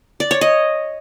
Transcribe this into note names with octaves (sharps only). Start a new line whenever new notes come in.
D5
C#5
D#5